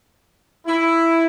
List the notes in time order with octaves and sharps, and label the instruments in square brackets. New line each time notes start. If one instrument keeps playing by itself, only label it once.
[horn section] E4